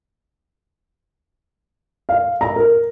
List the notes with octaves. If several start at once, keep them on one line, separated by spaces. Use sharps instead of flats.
F5
A#5
A#4